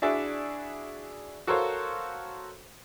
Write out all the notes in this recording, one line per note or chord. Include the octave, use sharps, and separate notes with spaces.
D4 E4 F#4 G#4 D5 E5
F#4 A4 A#4 C5 C#5 F5